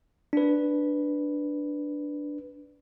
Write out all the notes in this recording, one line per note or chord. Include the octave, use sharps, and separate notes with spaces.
D4 B4